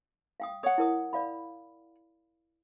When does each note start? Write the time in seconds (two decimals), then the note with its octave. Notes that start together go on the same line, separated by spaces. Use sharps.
0.40 F5 G5 D#6
0.63 C#5 F#5 D#6
0.78 E4 A#4 D#6
1.13 D5 F5 B5